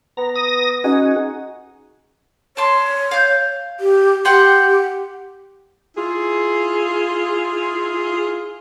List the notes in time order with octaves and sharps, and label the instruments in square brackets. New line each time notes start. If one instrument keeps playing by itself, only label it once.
[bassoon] B3 [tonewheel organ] A#5
[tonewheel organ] D#6 A#6
[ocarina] C#4 [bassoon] D#4 [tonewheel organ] F#4 G#4
[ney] C#5 [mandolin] A5 C6
[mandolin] F5 G6
[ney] G4
[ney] G4 [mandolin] F#5 G5 C6
[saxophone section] E4 F4 G#4